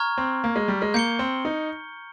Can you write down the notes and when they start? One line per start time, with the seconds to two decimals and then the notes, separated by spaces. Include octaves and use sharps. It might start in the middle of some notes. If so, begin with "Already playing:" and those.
Already playing: A#5 C#6 F6 G#6
0.18 C4
0.44 A#3
0.56 G#3
0.68 G3
0.82 G#3
0.94 A#3 G6 C#7 G7
1.19 C4
1.45 D#4